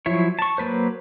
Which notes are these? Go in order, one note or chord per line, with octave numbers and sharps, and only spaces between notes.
F3 F#3 E4 C#5
A5 C#6
F#3 A#3 B4 C5